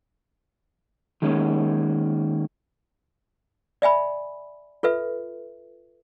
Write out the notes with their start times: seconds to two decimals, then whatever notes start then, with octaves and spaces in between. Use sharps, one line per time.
1.22 D#3 G#3 A#3 C#4
3.82 D5 E5 G#5 B5
4.83 F4 A4 B4 E5